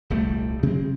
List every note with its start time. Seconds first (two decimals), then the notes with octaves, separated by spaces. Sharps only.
0.10 D#1 C2 G3 A3
0.63 C3 F#3 G#3 C4